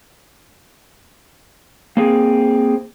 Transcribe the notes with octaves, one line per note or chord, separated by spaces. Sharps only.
A#3 C4 G#4